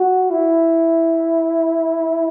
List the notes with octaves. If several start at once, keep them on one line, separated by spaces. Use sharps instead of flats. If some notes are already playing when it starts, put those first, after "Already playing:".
Already playing: F#4
E4